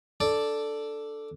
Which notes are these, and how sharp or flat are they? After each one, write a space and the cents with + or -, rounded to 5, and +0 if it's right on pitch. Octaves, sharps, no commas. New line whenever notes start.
D4 +0 A4 +0 D5 +0